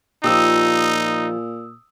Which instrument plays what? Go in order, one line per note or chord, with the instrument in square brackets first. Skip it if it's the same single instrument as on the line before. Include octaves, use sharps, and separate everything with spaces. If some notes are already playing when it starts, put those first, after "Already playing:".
[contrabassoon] A#2 [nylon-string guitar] F3 G4 [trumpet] D#4 [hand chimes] D#6 E6